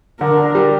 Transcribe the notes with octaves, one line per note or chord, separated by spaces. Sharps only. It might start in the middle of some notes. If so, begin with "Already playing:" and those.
D3 A#4
D4
G3